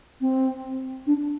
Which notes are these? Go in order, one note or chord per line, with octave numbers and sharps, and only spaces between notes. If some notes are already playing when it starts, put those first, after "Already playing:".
C4
D4